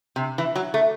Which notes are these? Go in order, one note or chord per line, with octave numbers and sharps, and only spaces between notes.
C3
E3
F#3
A3